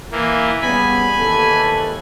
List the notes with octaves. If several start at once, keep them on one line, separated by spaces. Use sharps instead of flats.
E3 A#3
C#3 G3 B3 G#5 B5
D#2 E3 A4